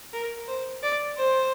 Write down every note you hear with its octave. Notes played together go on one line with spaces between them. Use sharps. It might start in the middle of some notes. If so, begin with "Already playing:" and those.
A#4
C5
D5
C5